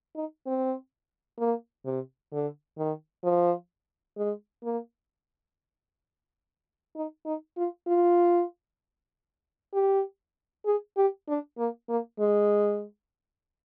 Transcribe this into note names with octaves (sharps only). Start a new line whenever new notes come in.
D#4
C4
A#3
C3
D3
D#3
F3
G#3
A#3
D#4
D#4
F4
F4
G4
G#4
G4
D4
A#3
A#3
G#3